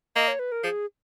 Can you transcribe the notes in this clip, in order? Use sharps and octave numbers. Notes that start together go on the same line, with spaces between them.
A#3 D#5
C#5
B4
A#4
F3 G#4